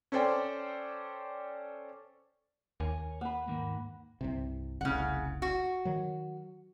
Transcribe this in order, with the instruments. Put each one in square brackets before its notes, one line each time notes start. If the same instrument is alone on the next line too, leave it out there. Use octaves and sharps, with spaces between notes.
[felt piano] C#4 A4 C5 D5 G5
[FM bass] D#2 [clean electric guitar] A#4 C#5 G#5
[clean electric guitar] A#3 B4 [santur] F#5 B5
[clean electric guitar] G#2 D#3 A#3
[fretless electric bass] C2 G2 C3
[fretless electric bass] F1 C2 F2 [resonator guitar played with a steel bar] C#3 F#5
[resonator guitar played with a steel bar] F#4
[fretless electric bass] D#3 F#3